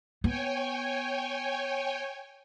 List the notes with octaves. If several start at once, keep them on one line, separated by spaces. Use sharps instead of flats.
B3 C#5 G5 G#5